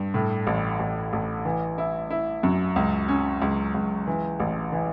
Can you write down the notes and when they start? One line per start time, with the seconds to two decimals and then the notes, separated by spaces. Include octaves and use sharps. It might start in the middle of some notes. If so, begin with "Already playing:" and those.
Already playing: G2
0.14 A2
0.47 A1
0.80 A1
1.13 A1
1.45 E3
1.78 E4
2.10 E4
2.43 F#2
2.76 C#2
3.08 C#4
3.42 C#2
3.74 C#2
4.07 E3
4.40 A1
4.72 E3